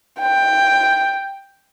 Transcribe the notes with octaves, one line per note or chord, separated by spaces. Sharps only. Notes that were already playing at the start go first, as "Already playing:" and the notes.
G5